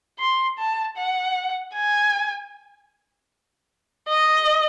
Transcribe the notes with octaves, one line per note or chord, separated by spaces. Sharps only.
C6
A5
F#5
G#5
D#5